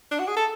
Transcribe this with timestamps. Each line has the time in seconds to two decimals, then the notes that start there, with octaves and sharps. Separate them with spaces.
0.11 D4
0.19 F#4
0.28 G#4
0.36 A4